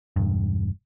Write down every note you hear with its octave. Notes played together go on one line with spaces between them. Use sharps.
E1 G2